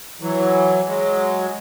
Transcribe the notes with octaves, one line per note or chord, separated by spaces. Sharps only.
E3 F#3
F#3 G#3